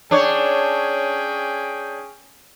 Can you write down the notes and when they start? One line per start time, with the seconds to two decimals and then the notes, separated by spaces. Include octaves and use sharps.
0.11 C#4 D4 G#4 C#5 G5